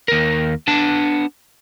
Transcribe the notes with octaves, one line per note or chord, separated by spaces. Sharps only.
D#2 A#4
B3 D4 A5